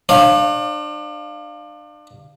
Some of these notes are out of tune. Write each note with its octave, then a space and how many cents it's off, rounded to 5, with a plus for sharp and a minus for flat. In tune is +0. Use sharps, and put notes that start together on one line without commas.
D4 +35 C#5 -35 F5 +0